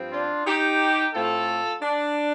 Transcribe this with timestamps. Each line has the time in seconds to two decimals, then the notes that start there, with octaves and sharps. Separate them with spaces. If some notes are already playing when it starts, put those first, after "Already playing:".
Already playing: G2 F3 C4
0.13 D4 F4
0.46 D#4 G4
1.14 A2 A3 C4 F4 A4
1.82 D4